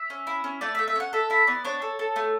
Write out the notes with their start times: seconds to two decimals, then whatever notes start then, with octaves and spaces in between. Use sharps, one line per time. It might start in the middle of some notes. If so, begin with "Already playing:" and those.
Already playing: E5
0.10 C#4
0.27 E4
0.44 C#4
0.61 A3 D5
0.75 E5
0.79 A3
0.88 E5
0.96 C#4 F#5
1.13 A4 E5
1.30 E4 E5
1.47 B3 D5
1.65 D4 C#5
1.82 A4
1.99 A4
2.16 A3